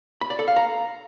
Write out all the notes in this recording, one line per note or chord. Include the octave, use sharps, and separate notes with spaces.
B5
D5
A4
F5
A#5